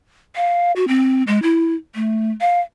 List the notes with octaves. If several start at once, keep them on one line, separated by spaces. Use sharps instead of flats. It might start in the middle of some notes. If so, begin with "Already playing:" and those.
F5
F#4
C4
G#3
E4
A3
F5